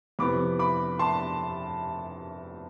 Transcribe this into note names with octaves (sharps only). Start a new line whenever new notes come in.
F2 C3 E3 B3 B5 D6
B5 D6
A5 C6